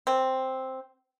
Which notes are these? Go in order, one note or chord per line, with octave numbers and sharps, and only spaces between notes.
C4